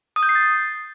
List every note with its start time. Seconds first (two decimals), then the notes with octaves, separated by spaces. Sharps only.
0.16 D#6
0.23 G6
0.29 C7
0.35 A6